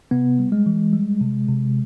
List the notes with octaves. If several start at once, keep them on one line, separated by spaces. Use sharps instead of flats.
C3 B3
G3
G#3
E3
G3
C3
C3